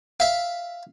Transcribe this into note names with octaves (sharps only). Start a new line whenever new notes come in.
E5 F5